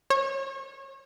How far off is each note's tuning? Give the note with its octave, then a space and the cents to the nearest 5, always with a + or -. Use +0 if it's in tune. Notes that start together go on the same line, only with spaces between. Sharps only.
C#5 -30